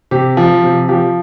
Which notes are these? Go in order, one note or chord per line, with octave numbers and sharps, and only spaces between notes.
C3 G4
F3
C3
F3 G4